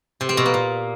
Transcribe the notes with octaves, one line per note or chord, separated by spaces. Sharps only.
C3
C4
B2
A#3
A#2